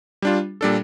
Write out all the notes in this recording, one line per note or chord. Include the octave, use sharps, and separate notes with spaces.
G3 D4 F4
A#2 G3 D4 A4